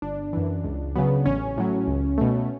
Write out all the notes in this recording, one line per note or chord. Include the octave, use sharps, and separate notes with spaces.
G1 D4
F#2 E3
C#2
C#3 F#3 B3
A1 C#4
A2 F#3
C#2
B2 A3